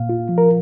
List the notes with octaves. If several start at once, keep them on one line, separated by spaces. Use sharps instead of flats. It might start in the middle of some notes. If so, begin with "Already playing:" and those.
Already playing: A#2 F5
F4
F3
A#4